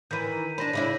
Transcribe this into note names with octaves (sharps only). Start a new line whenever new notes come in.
D#3 E3 G6 B6 D#7
D4 C5 B5 A#6
C#3 D4 E4